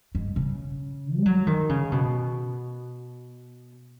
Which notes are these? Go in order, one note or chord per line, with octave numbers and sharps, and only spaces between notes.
G#2
C#3
G#3
F#3
D#3
C#3
B2